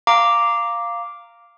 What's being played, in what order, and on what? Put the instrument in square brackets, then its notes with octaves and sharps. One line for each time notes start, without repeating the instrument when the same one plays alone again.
[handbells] F5 A#5 D6